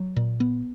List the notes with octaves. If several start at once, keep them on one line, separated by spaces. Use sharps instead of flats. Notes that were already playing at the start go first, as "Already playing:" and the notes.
Already playing: F#3
A#2
B3